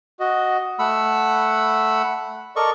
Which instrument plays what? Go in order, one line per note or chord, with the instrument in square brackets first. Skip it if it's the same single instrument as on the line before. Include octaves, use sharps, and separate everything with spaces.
[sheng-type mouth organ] F#4 D#5
[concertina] A3 B5 E6 [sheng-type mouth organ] F#5
[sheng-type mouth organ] A4 A#4 D5 [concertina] D#5 C#6